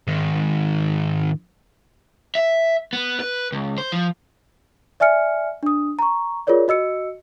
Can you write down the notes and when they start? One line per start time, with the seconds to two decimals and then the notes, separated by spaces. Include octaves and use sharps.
0.07 G#2 D#3
2.35 E5
2.93 B3
3.20 B4
3.52 C#2
3.78 C5
3.92 F3
5.00 D5 E5 G#5 F6 C#7
5.63 D4 D#6
5.99 A#5 C#6
6.47 F4 G#4 A#4 C#5 D5
6.68 F#4 D#5 E6 C#7